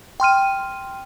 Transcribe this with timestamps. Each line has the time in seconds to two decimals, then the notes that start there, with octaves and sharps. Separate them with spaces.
0.20 G5 C6 F6 D#7